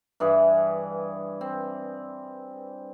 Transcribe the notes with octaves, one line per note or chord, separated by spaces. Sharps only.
G2 E3 G#4
C4